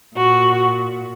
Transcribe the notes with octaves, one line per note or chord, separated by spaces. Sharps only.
A#2 F#4